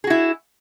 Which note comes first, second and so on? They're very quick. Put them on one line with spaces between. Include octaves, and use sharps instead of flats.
G#4 F#4 E4